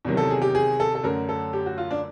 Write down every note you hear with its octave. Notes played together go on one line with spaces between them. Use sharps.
E2 C3 D#3 F#3
A4
G#4
G4
G#4
A4
A4
F#2 D3 F#3 A3 A#4
A4
G4
F#4
F4
D4